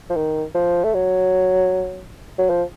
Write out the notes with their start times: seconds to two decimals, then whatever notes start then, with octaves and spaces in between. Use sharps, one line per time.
0.10 F3
0.16 D#3
0.55 F3
0.84 A3
0.94 F#3
2.38 F#3
2.50 F3